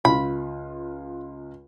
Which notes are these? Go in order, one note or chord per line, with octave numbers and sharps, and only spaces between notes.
C#2 F4 B5